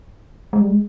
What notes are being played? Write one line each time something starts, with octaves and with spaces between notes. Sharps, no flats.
G#3
G3
G#3